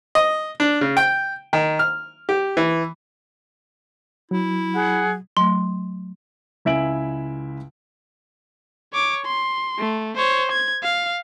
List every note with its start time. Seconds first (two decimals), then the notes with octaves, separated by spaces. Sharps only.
0.15 D#5
0.60 D4
0.81 C#3
0.97 G5
1.53 D#3
1.79 F6
2.29 G4
2.57 E3
4.31 F#3 E4
4.75 G#4 F#5
5.37 F#3 A3 C6
6.65 C#2 E4 E5 G#5 D7 F#7
8.93 C#5 D6
9.25 C6
9.78 A3
10.17 C5 C#5
10.52 G#6
10.83 F5